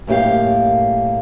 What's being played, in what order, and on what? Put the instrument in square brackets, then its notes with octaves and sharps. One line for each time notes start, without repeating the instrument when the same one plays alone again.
[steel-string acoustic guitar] F#2 A2 A#3 G4 F5